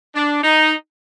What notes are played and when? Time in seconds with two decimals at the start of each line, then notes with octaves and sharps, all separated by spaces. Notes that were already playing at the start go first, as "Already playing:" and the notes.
0.15 D4
0.43 D#4